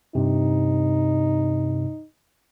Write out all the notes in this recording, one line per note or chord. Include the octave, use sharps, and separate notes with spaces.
G2 C3 D#4